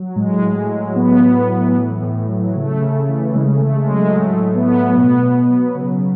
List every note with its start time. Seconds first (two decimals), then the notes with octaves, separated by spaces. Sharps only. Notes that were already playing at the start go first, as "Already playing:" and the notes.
Already playing: F#3
0.16 A2 G#3
0.42 A2
0.69 F#3
0.96 A2 B3
1.22 A2
1.49 E3
1.76 A2
2.02 A2
2.28 F#3
2.55 C#3 A3
2.82 C#3
3.08 E3
3.35 C#3 G#3
3.55 A3
3.62 C#3
3.76 G#3
3.89 F#3
3.96 G#3
4.15 A2 A3
4.42 A2
4.55 B3
4.68 F#3
4.95 B2 B3
5.22 B2
5.49 F#3
5.75 C#3